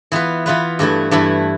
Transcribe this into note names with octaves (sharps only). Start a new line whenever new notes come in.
E3 B3 F4 B4
E3 B3 F4 B4
G2 E3 A3 E4
G2 E3 A3 E4